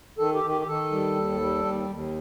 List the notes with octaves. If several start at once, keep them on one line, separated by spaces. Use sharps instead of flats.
D#3 A4
G4
D#3
G4
G4
D#3 A4
G3
D#2
G3
D#2
D#2